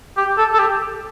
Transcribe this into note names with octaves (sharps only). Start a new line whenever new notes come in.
G4
A4
A4
G4